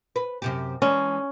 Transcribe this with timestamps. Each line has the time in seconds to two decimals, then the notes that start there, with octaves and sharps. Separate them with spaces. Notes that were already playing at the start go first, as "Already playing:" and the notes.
0.16 B4
0.42 F#2 C3 G4
0.82 E3 G#3 C#4 D4